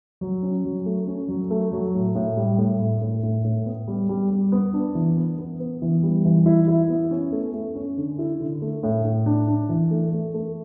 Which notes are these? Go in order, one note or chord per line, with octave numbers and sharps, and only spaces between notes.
F#3
C#4
F#3
A3
C#4
F#3
A3
F#3
A2
A2
G3
A2
A2
A2
A2
A2
B3
G3
G3
G3
B3
D4
E3
B3
B3
B3
E3
G3
E3
E4
E4
B3
C#4
A3
A3
C#4
D3
E4
D3
A3
A2
A2
D4
D4
E3
A3
A3
A3